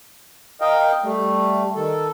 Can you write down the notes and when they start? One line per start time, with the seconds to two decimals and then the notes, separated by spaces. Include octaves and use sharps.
0.61 A#4 D#5 F5 G5
1.04 G3 A3
1.75 D#3 A4